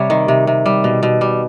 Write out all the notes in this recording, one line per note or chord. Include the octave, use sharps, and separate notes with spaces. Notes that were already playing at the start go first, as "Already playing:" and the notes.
Already playing: C3 G3 C#5
D#3
C3
C3
G3
B2
B2
G3